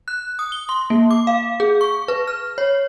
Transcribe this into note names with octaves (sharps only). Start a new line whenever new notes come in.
F#6
D#6
G7
C6
A#3
D6
F5
G#4
C#6
B4
F6
C#5